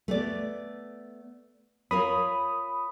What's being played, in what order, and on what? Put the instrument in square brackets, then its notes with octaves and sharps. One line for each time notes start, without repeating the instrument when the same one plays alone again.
[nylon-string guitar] A3 B3 D5
[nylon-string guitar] F4 A#4 C#5 [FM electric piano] B5 D#6